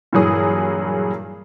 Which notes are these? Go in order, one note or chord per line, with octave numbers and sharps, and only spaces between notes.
G2 A#2 E3 F#3 G#4 D#6